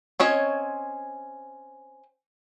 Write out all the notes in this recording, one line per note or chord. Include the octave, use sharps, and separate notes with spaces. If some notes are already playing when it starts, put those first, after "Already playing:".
C4 C#4 C#5 D#5